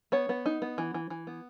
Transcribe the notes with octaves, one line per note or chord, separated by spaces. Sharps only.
B3 C#5
B3
D#4
B3
E3
E3
E3
B3